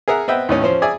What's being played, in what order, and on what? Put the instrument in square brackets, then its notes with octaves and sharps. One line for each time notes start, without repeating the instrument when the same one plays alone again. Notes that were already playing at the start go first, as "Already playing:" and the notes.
[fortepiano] G#4 A#4 E5 F#5
B3 C4 B4 D#5 E5 G5
D#2 A2 C#4
F3 C4 C#4 C5
G#4 D5 E5 G#5